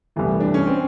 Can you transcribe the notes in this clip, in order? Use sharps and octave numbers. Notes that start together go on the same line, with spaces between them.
C2 C3 E3 A3
D4
C#4
C4